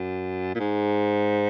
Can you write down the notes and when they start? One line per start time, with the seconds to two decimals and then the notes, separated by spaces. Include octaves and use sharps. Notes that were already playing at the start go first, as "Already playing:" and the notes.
Already playing: F#2
0.55 A#2
0.60 G#2